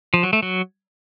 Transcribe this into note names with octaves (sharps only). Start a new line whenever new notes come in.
F3
F#3
A3
F#3